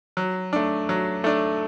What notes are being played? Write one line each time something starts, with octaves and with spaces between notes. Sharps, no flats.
F#3
A3 D4
F#3
A3 D4